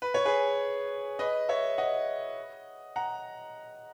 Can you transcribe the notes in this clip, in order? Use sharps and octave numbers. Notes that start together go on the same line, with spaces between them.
B4
C#5
G#4 B4
B4 D#5
C#5 E5
D#5 F#5
F#5 A#5